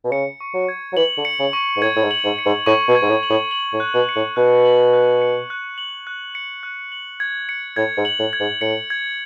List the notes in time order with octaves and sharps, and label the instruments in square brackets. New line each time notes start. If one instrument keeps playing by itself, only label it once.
[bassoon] B2
[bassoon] C#3 [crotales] C#7
[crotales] C#6
[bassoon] F#3
[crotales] G#6
[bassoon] F#3
[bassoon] E3 [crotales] F#7
[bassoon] D3
[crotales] C#7
[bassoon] C#3
[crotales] C#6
[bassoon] G#2
[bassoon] A2 [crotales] G#6
[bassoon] A2
G#2
[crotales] F#7
[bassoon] G#2
[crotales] C#7
[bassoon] G#2
[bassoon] A2 [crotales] C#6
[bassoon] B2
[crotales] G#6
[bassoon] G#2
A2
[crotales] F#7
[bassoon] A2
[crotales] F#7
[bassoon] A2
[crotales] F#6
[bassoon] B2
[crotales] C#7
[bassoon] A2
[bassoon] B2 [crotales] F#6
[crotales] F#7
F#6
C#7
F#6
F#7
F#6
C#7
F#6
F#7
G#6
C#7
[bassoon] A2 [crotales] G#6
[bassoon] G#2
[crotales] F#7
[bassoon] A2
[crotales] G#6
[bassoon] G#2
[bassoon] A2 [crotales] C#7
[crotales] G#6